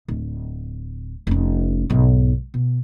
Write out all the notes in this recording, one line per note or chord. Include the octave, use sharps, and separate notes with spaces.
D1
F1 C#4
B1 G#2
B2